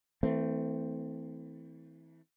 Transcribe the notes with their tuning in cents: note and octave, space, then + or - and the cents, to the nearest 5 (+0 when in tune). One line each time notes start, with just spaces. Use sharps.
E3 -25 A3 +20 C4 -10